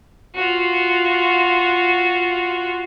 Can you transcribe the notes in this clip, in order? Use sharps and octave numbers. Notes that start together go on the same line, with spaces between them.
F4 F#4